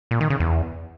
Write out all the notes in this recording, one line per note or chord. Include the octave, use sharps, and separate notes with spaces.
A#2
D#3
C#3
E2